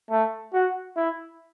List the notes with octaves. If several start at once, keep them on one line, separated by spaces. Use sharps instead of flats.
A3
F#4
E4